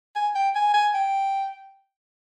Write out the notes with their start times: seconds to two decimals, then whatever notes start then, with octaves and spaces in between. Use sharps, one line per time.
0.16 G#5
0.35 G5
0.55 G#5
0.74 G#5
0.94 G5